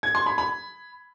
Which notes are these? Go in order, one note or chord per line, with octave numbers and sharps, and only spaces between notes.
G#6
C6
B5
B5